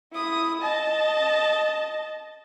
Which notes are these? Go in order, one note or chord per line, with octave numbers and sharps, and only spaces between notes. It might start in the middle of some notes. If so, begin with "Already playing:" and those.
E4 D#6
D#5 A5